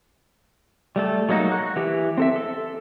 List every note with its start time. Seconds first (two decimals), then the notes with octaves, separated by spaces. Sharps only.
0.96 G3 A3 A4
1.29 F#3 G#3 A#3 D#4 F#4
1.52 F#4 F#6
1.76 E3 G4
2.17 C4 A4 E5
2.36 A4